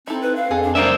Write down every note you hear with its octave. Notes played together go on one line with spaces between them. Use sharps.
C4 D#4 E4 A4
B4
F5
F2 G#4 A4
D4
F#3 A#3 D4 A#4 C5 D5 E5